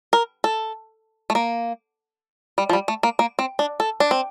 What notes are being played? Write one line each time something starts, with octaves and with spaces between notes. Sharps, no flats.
A#4
A4
A3
A#3
G3
F3
G3
A3
A#3
A#3
C4
D4
A4
D4
C4